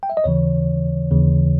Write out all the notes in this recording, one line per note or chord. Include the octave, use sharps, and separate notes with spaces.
G5
E5
D#5
D#2 C#3 E3 C#5
D#2 C#3 E3